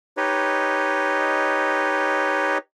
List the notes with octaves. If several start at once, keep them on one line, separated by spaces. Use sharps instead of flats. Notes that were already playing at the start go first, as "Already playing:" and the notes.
D#4 G4 B4 C#5 D#5